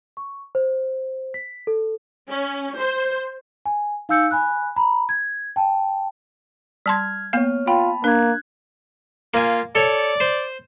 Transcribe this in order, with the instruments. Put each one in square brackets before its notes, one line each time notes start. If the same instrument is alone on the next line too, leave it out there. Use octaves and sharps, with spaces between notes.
[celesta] C#6
C5
B6
A4
[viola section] C#4
C5
[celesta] G#5
D#4 F5 G#5 E6 G6 C#7
G#5 B5 F#6
A#5 B5
G#6
G5 A5
[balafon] G3 A5 C6 [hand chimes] F6 G#6
[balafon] A#3 B3 F5 [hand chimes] C#5 F6
[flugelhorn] F4 [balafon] G5 [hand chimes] A5 B5
[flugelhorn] A#3 [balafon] D4 [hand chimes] F#6 G#6
[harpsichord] A#3 G#5 [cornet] F4
[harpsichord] A4 C#5 [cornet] D5
[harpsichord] C5